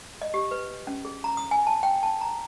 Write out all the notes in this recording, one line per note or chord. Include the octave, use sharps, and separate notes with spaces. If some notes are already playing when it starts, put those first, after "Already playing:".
D#5
G4
B4
C#4
G#4
A#5
D#6
G#5
A5
G5
A5
A#5